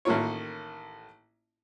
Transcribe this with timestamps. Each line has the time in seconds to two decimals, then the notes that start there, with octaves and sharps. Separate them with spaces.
0.05 A1 D#3 A#3 F4 C#5